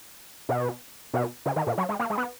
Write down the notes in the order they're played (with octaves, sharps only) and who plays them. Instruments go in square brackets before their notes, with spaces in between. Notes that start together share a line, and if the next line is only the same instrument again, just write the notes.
[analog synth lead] B2
B2
C#3
D#3
A#2
F#3
G#3
A#3
G#3
B3